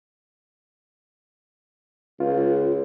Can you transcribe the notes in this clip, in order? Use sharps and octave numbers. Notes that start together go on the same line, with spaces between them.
C#2 F4